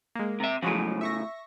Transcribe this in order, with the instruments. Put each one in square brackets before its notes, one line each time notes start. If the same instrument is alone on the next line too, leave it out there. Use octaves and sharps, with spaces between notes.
[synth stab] G#3 A#3
[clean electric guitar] C3 E5
[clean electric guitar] A2 C#3 [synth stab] F3 F#3 G#3
[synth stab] E5 C#6 A#6